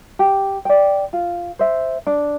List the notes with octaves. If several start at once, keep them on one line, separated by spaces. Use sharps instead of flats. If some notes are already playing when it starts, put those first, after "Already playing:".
G4
D5 G5
F4
C5 E5
D4